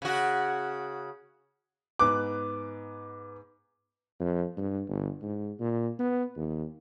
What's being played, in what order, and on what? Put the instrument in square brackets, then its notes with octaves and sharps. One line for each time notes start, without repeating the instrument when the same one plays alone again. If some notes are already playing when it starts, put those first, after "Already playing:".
[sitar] C#3 F#4
[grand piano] G#2 B3 F#6 [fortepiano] D6
[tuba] F2
G2
G1
G#2
A#2
B3
D#2